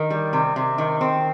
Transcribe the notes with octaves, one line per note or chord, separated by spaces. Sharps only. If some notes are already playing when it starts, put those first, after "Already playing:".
Already playing: D#3
G3
C3
C3
D#3
C4